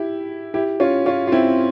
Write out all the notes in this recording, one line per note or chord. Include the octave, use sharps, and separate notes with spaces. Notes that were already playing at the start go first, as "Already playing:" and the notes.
Already playing: E4 G4
E4 G4
C#4 F4
C#4 F4
F4
C4 E4